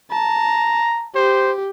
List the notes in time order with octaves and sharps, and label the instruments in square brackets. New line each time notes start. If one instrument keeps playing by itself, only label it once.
[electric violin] A5 [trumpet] A#5
[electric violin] G4 [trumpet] C5